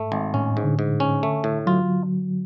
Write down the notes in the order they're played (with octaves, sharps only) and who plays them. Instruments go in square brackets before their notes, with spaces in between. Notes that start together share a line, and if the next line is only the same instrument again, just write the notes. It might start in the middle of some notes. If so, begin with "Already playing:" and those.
Already playing: [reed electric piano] G#2 [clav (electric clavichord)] A3
[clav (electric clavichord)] G#1
[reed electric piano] A2 [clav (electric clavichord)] C#4
[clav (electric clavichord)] G#2
[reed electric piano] D3
[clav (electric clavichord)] G#2
C#4
A3
A2
[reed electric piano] F#3 [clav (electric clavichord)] F4